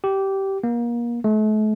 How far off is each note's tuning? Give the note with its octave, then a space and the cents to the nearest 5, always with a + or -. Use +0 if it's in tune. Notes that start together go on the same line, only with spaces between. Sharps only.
G4 -15
A#3 +30
A3 -40